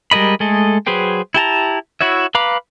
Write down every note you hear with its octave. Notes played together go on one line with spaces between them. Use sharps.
G3 G#3 A#4 D#5 B5
G#3 A3 G#4 A4 D#5
F#3 G#4 B4 C5 G5
E4 G4 A5 A#5
E4 F#4 C#5 E5
B4 F5 A#5 B5 D6